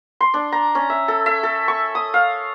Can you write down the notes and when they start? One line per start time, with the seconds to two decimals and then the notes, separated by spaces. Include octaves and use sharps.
0.20 C6
0.34 D4
0.52 A#5
0.75 C#4
0.90 E5
1.08 A4
1.26 E5
1.43 A4
1.68 C#6
1.95 D#6
2.14 F5